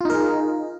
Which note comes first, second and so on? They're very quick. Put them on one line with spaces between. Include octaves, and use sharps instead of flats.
F4 D#4 A#4 G#4